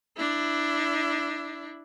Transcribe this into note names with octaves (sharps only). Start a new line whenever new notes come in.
D4 E4